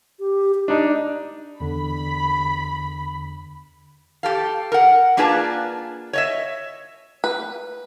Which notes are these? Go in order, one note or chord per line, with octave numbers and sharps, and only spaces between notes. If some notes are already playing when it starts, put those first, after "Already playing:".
G4
G4
D4 D#4
E2 D3 B5
G4 A4 F5
A#4 F#5
A#3 D4 F4 G#4 B4 A5
C#5 D#5 E5
B4